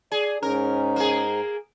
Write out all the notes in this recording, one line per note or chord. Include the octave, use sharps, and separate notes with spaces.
G#4 D5
G#2 C#4 D#4 A#4
A#3 G#4